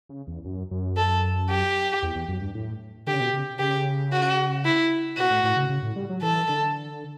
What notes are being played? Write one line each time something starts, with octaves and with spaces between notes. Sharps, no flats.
C#3
E2
F#2
F#2
A4
G4
E2
E2
F#2
G2
A2
D3 G4
C#3
B2
C#3
C#3 G4
F#4
E4
B2 F#4
A2
A2
C#3
C#3
A2
G3
F#3
E3 A4
D3